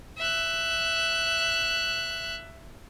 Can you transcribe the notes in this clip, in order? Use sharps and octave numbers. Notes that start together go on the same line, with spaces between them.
E5 F#6